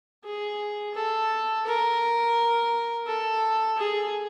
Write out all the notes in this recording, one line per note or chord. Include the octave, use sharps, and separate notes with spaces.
G#4
A4
A#4
A4
G#4